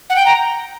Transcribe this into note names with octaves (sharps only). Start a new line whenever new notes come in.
F#5
G5
A#5